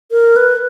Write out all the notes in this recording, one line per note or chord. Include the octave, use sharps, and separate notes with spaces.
A#4
B4